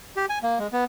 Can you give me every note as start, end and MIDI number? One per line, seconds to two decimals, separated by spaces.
0.17 0.26 67
0.30 0.39 80
0.43 0.59 58
0.59 0.67 56
0.73 0.84 59